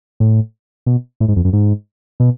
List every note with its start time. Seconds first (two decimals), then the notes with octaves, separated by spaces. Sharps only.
0.20 A2
0.86 B2
1.20 A2
1.28 G#2
1.36 F2
1.45 F#2
1.53 G#2
2.20 B2